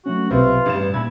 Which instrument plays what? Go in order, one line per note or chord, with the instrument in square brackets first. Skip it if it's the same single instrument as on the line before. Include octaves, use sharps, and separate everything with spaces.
[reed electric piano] F#3 A3 C#4 [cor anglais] F#4
[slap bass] B1 [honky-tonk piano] C3 [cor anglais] F4 [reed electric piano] B4
[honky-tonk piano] A1 G3 E7 [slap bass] G2 E3
[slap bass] A#2 [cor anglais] E4 [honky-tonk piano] G#6